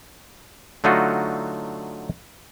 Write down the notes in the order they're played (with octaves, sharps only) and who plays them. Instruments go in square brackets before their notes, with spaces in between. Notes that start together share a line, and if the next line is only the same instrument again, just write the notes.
[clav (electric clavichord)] D3 F#3 A3 D#4 F4 F#4